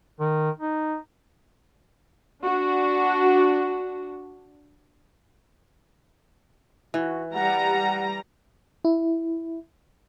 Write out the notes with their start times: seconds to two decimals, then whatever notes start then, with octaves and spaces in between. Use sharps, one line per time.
0.20 D#3
0.59 D#4
2.43 D4 F#4
6.94 E3 F#4
7.34 G3 F#5 A#5
8.85 E4